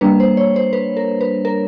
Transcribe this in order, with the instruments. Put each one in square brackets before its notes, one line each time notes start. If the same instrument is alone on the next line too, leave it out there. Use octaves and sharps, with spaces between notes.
[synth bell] G3 A#3 D4 B4
C5
C#5
C5
B4
A#4
B4
A#4